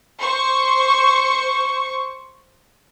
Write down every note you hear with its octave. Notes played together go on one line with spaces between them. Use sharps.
C5 C#6